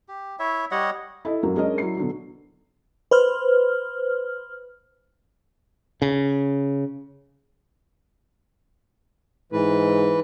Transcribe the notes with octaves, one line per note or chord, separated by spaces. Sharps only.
G4
E4 C#5 E5
G3 C#5 D#5 F#5
E4 A4 D#5
F#2 F#3 A#3
G#3 C#4 D4 A#4 D#5
F#3 E4 C7
B2 D3 F#3
B4 C5 F6
C#3
G#2 E3 B4